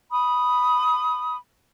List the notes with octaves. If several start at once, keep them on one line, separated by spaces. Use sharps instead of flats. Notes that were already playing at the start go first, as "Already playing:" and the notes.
B5 D#6